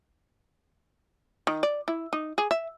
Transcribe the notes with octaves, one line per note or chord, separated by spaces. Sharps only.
D#3
D5
E4
D#4
G#4
E5